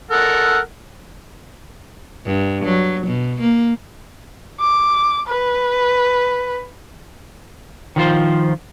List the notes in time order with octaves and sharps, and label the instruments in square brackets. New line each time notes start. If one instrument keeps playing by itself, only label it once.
[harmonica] A4 A#4 F#5
[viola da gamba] G2
F#3
B2
A#3
[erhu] D6
B4
[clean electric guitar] D#3 F3 F4 C5